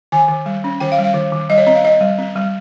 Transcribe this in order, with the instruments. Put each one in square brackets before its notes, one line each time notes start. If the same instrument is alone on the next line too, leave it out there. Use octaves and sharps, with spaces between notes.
[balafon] D#3 G#5
D#3
G3
C#4
D#3 G5
F5
G3
F5
D#3
D#3
G3 D#5
C#5
C4 D#5
F5
C4 D#5
G3
C4
G3